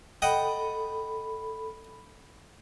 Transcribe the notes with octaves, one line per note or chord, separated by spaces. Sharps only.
A4 D#5 F#5 G5 B5